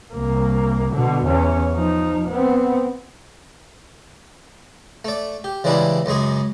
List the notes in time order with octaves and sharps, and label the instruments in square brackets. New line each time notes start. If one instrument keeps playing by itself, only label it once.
[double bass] C2 A#3
B2 D3
E2 C#4
F3 D#4
B3 C4
[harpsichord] A3 D5
G4
C#3 E3 G3 G#3 D4 E4
C#2 F#2 G#3 G#4